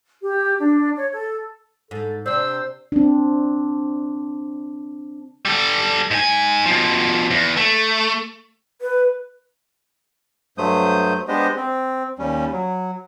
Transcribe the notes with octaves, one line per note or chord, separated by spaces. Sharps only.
G4
D4
C#5
A4
G#2 A4
C3 D4 C5 E6
C4 D4
G3 A4
G#2 G#5
B2 F3
E2
A3
B4
G2 F#3 A3 C5 D#6 G6
G#3 B3 D4 G4 C5 D#5
C4
D#2 G3 C#4
F#3